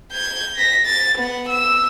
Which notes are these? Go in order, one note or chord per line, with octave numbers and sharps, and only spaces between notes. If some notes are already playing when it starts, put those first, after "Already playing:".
G6 G#6
A#6 B6
A6
B3 F#5
E6